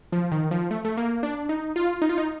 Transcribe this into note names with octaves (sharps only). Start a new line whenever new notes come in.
F3
D#3
F3
A3
A3
A#3
D4
D#4
F4
D#4
F4
D#4